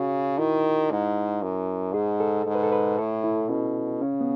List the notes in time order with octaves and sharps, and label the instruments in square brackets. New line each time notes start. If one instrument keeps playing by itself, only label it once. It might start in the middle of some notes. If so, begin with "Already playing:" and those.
Already playing: [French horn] C#3 [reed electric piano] F#4
[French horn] D#3 [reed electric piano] E4
[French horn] G#2
F#2
[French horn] G#2 [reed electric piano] G#4
[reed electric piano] A4
[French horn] G#2
[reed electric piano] B4
A4
B4
[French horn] A2 [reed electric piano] A4
[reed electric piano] E4
[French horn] B2 [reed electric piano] C#4
[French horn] C#3 [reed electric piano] C#4
[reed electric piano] B3